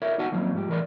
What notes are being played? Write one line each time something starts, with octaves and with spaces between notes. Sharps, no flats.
E4 A#4 C#5 D5 E5
B3 D#4 F#4 F#5 G#5 A5
D#3 F3 F#3 A#3 C4 C#4
G#2 F3 G3 G4
A2 E3 A#4 D5 C6